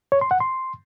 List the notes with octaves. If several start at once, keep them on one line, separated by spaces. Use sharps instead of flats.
C#5
C6
F#5
C6